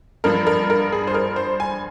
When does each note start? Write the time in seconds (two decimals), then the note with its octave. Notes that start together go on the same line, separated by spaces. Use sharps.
0.24 G2 F3 A#4
0.47 A#4
0.70 A#4
0.92 G#4
1.07 C5
1.14 A#4
1.36 C5
1.60 G#5